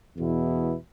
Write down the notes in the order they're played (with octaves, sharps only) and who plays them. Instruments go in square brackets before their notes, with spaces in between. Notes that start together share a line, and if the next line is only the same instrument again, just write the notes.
[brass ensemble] E2 B2 B3 E4